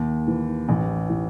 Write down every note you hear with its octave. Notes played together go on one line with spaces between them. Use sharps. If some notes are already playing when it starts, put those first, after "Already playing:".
Already playing: D#2
E3
A1
E3